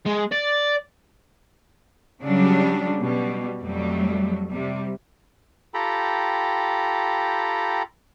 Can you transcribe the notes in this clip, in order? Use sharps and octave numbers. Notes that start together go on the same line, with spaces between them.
G#3
D5
C#3 F#3 G3 D4
B2 G3
F2 F#3 G3 A3
C3 G3
F4 G4 A4 G5 A#5 B5